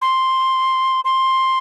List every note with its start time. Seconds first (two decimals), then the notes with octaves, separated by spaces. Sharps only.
0.02 C6
1.05 C6